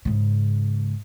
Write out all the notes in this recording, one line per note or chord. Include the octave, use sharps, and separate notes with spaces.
G#2 C#3